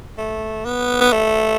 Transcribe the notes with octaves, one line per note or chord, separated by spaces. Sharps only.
A3
B3
B3
A3